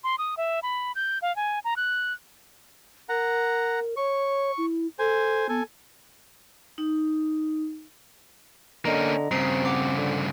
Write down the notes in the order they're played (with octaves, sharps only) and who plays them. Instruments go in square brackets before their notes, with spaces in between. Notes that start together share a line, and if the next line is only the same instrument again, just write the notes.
[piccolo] C6
D#6
E5
B5
G6
F5
G#5
A#5
F#6
[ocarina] A#4 [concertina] F#5 A#5
[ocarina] C#5 [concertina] C#6
[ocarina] E4
[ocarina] A4 [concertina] C5 G#5
[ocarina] B3 [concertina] A4 G#5
[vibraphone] D#4
[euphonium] D3 [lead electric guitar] A#3 C#4 [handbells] D#5 A#5
[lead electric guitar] G2 C#3 [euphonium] C4 [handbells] A#5 C7
[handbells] C5 F#5 D6
[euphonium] D3